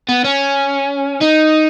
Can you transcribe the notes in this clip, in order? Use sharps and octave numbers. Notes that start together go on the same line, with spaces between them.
B3
C#4
D#4